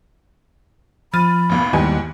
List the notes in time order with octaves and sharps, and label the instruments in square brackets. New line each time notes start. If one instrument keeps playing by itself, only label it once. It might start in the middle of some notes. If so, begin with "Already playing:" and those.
[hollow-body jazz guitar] F3 [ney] B5 [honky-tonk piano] F6 A6 D#7
[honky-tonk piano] A1 D#2 B2
[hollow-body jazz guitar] D#2 G3 G#5 [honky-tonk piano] G#2 E3 B3